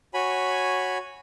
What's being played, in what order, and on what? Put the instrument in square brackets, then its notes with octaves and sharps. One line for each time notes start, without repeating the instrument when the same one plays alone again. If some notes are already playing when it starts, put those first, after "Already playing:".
[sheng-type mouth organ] F#4 C#5 G#5 B5